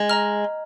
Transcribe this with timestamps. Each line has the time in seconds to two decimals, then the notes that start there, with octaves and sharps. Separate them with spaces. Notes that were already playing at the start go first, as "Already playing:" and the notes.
Already playing: G#3
0.10 D#5 A#5 F6